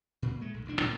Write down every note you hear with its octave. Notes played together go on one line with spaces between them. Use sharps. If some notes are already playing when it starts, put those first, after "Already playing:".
A#2
G#3 A3
A#1
E1 D2 D4
A2 E3 A#3 B3